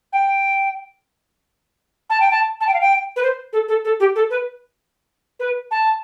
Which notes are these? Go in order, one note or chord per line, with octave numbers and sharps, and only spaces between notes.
G5
A5
G5
A5
A5
G5
F5
G5
B4
C5
A4
A4
A4
G4
A4
B4
B4
A5